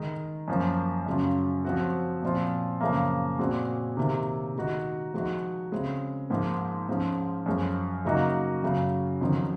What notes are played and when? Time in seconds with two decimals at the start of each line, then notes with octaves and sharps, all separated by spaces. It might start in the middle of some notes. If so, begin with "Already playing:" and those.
Already playing: D#3 G#3 D#4
0.48 F#2 F3 A#3
1.06 F#2 C#3 F#3 C#4 F4
1.65 F3 C4 F#4
2.22 A#2 F3 C4 F4
2.81 F#2 C#3 F3 A#3
3.39 A#2 G#3 C4 F#4
3.97 C3 D#3 A#3
4.55 D#3 G#3 D#4 F#4
5.13 F3 G#3 D#4 F#4
5.72 C#3 G#3 C4
6.30 G#2 F3 A#3
6.89 G#2 F3 G#3 C#4
7.46 F#2 F3 G#3
8.05 C#3 F#3 A#3 D#4 F#4
8.63 F#2 C#3 F#3
9.21 F2 D#3 F#3 C#4 F4